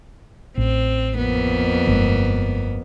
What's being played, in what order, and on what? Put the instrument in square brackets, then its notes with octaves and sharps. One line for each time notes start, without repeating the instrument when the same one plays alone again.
[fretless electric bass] A1 [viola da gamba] C4
[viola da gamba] F2 A#3 B3
[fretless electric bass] G1 G#3